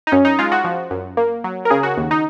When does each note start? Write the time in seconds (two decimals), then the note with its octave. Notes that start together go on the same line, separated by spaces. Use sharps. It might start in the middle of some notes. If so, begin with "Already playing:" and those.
0.07 D#4
0.12 F#2 C#4
0.25 D#4
0.39 G#3 F4
0.52 F#4
0.64 F3
0.91 F#2
1.17 A#3
1.44 F#3
1.65 A#4
1.70 C#3 G#4
1.83 F#4
1.97 D#2
2.11 D#4